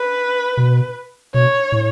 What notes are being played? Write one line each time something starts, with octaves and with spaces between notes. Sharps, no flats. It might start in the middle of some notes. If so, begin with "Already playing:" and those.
Already playing: B4
B2
B2 C#5
A2